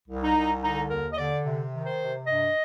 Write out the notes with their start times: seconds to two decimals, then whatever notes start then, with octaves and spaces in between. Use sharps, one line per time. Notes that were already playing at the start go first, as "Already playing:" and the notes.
0.09 C2
0.22 D#4
0.36 C2
0.62 D3 D#4
0.90 D#2 A#4
1.12 D#5
1.18 D3 D5
1.44 C3
1.72 D#3
1.86 C5
1.99 C3
2.27 G2 D#5